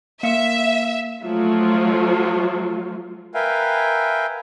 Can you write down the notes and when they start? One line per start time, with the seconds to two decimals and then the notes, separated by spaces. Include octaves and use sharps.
0.23 A#3 E5 F5 C#7
1.23 F3 F#3 A3 F4
3.34 A#4 B4 E5 F5 G5 G#5